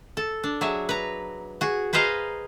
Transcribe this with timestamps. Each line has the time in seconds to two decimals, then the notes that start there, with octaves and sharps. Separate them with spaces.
0.17 A4
0.44 D4
0.61 F#3 G#4 E5
0.89 B4 A#5
1.61 F#4 G#4
1.93 G#4 B4 C5 D#5 F5 A#5